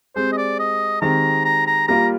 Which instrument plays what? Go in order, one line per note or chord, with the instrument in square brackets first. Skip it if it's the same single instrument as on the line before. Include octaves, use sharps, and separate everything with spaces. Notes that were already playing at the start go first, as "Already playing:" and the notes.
[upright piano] G#3 C4 G4 [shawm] C5
[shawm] D#5
D5
D#5
[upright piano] D#3 G#3 C4 G4 [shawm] A#5
[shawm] A#5
A#5
[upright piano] G3 A#3 F4 A#4 [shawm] A#5